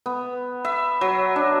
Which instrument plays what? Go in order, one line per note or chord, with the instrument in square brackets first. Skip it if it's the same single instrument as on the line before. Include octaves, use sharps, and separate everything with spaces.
[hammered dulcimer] B3
E5
F#3
D4